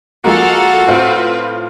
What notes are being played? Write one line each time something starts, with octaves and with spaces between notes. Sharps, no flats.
F3 G#3 A#3 F#4 A4 F5 F#5
A2 C4 F4 B4